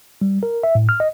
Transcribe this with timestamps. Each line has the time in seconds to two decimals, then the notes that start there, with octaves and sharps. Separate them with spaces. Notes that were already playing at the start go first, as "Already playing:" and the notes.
0.21 G3
0.43 A#4
0.63 E5
0.75 A2
0.89 F6
1.00 D#5